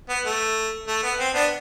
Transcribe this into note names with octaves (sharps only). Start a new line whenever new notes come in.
B3
A3
A3
B3
C4
B3 D4